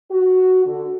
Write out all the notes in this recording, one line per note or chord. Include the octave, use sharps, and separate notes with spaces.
F#4
D3